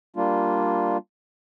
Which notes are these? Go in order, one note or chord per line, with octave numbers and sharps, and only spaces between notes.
G3 A#3 D4 F4